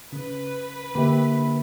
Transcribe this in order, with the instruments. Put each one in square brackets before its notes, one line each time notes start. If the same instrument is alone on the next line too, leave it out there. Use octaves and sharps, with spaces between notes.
[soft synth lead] C#3 [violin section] B4
[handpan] D3 E5 [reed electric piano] A#3 G4 [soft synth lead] B5